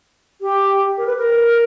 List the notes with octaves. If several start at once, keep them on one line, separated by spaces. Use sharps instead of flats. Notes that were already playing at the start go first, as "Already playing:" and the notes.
G4
A#4
B4
A#4